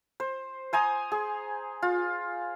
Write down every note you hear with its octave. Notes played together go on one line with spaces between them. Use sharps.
C5
C5 G#5 A#5 D#6
G#4
F4